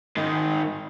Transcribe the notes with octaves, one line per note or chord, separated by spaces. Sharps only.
G#2 D#3